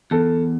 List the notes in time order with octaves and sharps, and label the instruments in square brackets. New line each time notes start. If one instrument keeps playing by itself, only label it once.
[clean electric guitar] E2 [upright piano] A4